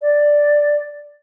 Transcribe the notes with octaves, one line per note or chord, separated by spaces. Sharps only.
D5